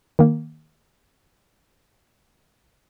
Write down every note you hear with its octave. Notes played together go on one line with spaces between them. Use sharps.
D#3 A#3